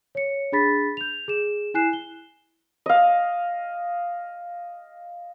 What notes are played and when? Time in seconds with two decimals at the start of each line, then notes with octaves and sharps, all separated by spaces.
0.15 C#5 C#7
0.52 D4 G#4 B5 A6 B6
0.97 G6 F7
1.28 G#4 E7
1.74 E4 G#5 F#6 C7 E7
1.93 G7
2.86 D#5 F5